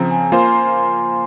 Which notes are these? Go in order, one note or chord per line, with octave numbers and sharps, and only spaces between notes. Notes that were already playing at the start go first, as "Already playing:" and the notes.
Already playing: C#3 F3 C4 A#5
G#5
A#3 F4 C5 C6